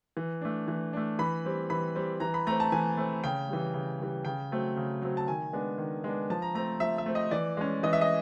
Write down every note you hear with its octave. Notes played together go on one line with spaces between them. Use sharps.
E3
A3 D4
E3
A3 D4
E3 B5
G3 C4
E3 B5
G3 C4
E3 A#5
B5
A3 C4 A#5
A5
E3 G#5
A3 C4
C#3 G5
E3 G3
C#3
E3 G3
C#3 G5
F#3 A3 C4
C#3
F#3 A3 C4
A5
D#3 G#5
G#3 B3 D4
D#3
G#3 B3 D4
F3 A5
A#5
A3 C4 A#5
F3 E5
E5
A3 C4
D#5
E3 D5
G#3 C#4
E3 D#5
E5
D#5